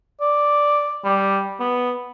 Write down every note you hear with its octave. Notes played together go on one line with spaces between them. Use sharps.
D5
G3
B3